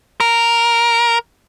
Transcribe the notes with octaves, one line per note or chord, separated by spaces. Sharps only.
A#4